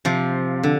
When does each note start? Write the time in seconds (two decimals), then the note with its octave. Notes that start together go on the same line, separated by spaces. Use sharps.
0.05 C3 F3
0.63 D3